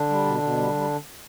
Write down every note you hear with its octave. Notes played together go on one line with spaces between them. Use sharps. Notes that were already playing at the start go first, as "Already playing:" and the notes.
Already playing: D3 D4
G3
B2
B2
G3
G3